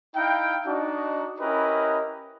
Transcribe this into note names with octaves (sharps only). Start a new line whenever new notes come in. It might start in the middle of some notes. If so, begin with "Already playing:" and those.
D#4 E4 F5 G5
D4 D#4 F#4
C#4 E4 G4 A#4 B4 D#5